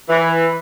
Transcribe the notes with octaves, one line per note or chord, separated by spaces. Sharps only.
E3